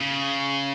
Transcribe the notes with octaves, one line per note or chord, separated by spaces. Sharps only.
C#3